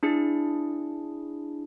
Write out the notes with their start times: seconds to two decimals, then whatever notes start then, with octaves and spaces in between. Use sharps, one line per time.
0.03 D4 E4 G#4